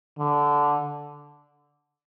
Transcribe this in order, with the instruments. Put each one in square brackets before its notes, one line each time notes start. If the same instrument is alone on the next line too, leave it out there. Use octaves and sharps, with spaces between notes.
[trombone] D3